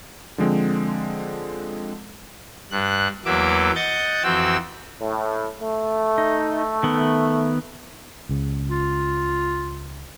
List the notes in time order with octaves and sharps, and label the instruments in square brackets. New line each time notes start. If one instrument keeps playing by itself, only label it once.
[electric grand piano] D3 F3 G#3 C4
[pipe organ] G2 F#6
E2 E3 F#3 A#3 E5 D6
D#5 F#5 G6 A6
F2 E3 C4 F#4 G5 E6
[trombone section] A2
A3
[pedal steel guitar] D#4
D#3 B3
[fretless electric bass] C#2 C#3
[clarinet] F4